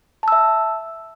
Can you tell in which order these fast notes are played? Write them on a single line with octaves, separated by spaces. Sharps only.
A5 E6 E5